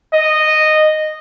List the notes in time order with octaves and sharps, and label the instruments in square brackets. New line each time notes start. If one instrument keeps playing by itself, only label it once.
[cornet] D#5